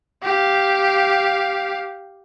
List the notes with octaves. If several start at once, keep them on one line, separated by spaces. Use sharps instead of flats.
G4 F5